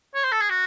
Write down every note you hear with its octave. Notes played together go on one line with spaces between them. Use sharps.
C#5
C5
A4
G#4
F#4